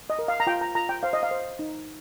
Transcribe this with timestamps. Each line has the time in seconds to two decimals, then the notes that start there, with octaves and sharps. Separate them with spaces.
0.10 D#5
0.19 A#4
0.28 F5
0.40 A#5
0.47 F4 G5
0.61 A#5
0.75 F4 A#5
0.89 G5
1.03 C5 F5
1.13 D#5
1.23 F5
1.31 C5
1.59 D#4